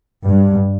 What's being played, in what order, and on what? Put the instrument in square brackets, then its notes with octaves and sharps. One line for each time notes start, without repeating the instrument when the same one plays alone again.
[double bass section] G2